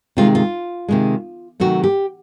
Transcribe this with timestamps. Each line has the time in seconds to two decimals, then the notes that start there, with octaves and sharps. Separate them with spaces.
0.17 C3 D#3 G#3 F4
0.35 F4
0.88 C3 D#3 G#3
1.60 C3 D#3 F#3 A3 F#4
1.84 G4